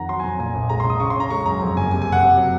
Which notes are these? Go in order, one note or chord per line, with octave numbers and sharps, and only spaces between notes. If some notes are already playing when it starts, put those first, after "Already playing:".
Already playing: F2 D#3 F#5 A#5
F#3 C6
G#5
F2 A#5
A#2 G#5
A#1
G#3 A#5
A#1 C6
D#6
C#3 C#6
C6
C#4 A#5
G#3 C#6
F#2 A#5
F2
F#1 G#5
C3 G#5
G#5
F#1
F#5
C3
F#3